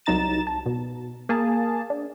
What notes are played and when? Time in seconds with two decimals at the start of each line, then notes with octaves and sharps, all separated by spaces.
0.06 C2 F#3 D#4 A#5 A6 E7
0.47 A5
0.66 B2
1.29 A#3 G#4 A5
1.90 D4